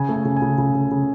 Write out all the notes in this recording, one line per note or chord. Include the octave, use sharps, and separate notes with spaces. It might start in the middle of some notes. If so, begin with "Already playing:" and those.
Already playing: C#3 G#5
A3
G#5
C#3
G#5
C#3
C#3
C#3
C#3